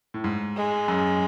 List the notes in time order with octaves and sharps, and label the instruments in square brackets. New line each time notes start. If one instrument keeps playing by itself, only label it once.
[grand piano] A2
G#2
[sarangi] G#3
[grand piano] F#2